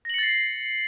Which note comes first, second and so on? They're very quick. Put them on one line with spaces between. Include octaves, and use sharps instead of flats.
A#6 F#7 C#7 A6 C7